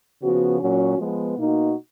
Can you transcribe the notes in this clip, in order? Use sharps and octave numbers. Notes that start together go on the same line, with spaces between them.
C#3 F3 B3 F#4
A#2 F#3 C#4 F#4
F3 G#3 B3
B2 A#3 D#4 F#4